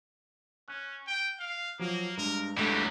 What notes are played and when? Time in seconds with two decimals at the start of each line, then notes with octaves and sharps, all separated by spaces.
0.68 C#4 F#6
1.07 G5
1.40 F5
1.79 F3 F#3 A#3
2.17 G2 G#3 A#4
2.57 G2 E3 F#3 G#3 A3 G4